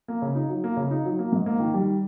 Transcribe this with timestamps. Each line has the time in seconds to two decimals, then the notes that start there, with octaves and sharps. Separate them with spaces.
0.08 A#3
0.22 C#3
0.35 D#4
0.49 F#3
0.64 A#3
0.77 C#3
0.91 D#4
1.05 F#3
1.19 A#3
1.32 G#2
1.46 A#3
1.60 D#3
1.74 G3